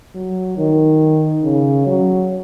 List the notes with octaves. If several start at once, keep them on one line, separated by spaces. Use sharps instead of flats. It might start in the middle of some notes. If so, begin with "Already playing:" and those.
F#3
D#3
C#3
F#3